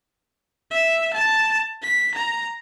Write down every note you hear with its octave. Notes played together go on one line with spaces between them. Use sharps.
E5
A5
B6
A#5